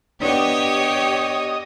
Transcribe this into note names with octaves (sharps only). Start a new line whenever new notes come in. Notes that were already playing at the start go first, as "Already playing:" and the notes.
B3 D4 G4 C#5 D#5